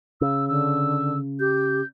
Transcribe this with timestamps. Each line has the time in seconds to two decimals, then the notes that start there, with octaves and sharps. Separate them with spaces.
0.21 C#3 E6
0.48 D3 E6
1.40 G4 G6